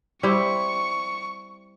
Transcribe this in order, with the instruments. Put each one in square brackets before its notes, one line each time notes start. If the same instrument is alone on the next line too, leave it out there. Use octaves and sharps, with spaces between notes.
[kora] G3 C4 E4 [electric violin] C#6